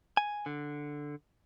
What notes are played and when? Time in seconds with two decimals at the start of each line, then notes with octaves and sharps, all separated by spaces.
0.17 G#5
0.46 D3